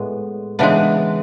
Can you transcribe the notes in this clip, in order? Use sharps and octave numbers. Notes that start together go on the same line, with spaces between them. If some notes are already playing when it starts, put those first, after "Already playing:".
Already playing: A2 G#3 B3
C#3 E3 G#3 B3 D4